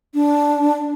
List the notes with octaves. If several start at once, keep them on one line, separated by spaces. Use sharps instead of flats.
D4